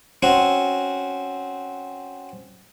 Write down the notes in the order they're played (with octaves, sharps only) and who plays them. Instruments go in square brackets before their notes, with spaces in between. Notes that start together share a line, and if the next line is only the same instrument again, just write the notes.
[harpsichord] C4 C#4 F#4